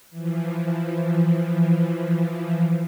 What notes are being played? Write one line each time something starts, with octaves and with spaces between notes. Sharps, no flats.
E3 F3